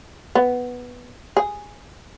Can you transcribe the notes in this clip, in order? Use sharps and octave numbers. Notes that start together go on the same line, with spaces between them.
B3
G#4